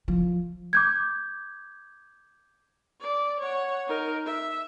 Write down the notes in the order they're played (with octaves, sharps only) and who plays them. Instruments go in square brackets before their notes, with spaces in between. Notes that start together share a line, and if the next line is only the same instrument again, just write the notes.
[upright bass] F3
[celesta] D6 G6 G#6
[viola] D5
C#5 F#5
D#4 A#4
E5